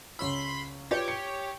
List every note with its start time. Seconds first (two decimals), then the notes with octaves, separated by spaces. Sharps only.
0.19 C#2 C#5 B5 C6 E6 B6
0.91 F4 G4 B4 C#5 D5
1.08 C#7